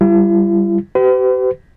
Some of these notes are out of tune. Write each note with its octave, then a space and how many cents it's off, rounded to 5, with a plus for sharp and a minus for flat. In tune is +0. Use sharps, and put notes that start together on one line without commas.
G3 +0 E4 +45
G4 -40 B4 +45